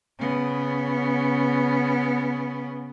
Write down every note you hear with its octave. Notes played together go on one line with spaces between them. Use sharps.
C#3 B3